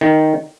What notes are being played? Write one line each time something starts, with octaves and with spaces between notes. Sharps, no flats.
D#3